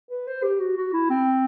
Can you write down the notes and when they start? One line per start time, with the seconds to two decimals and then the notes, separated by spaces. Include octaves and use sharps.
0.10 B4
0.27 C5
0.43 G4
0.60 F#4
0.77 F#4
0.93 E4
1.10 C4